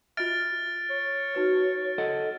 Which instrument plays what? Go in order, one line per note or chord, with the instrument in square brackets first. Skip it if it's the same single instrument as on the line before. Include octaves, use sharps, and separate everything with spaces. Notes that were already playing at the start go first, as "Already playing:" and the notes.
[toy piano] F4 D#5 E5 [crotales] F6 A6 D7
[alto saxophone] C#5
[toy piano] D#4 F#4 B4
[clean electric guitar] A4 D#5 F#5